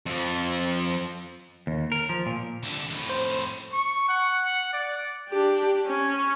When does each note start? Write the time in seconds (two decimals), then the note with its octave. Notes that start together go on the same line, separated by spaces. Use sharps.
0.06 F2 F3
1.67 D#2
1.92 A#4
2.09 F3
2.26 A#2
2.63 C2 D3
2.90 F2 A2
3.09 C5
3.73 C#6
4.09 F#5
4.73 D5
5.29 D4 G4
5.86 C#4